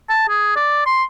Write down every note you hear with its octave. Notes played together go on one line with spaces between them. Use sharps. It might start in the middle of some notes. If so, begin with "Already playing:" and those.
A5
G#4
D5
C6